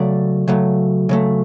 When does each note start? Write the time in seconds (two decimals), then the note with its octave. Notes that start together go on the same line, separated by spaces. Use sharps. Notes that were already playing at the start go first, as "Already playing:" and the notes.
Already playing: C#3 F#3 A3 D5
0.48 C#3 F#3 A3
1.09 C#3 F#3 A3